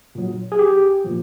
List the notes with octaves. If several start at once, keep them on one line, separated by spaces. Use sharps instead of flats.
A#2 F#3
G#4
B1 G4
A#2 F3